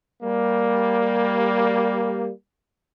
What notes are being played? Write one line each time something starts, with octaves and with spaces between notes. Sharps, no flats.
G3 A#3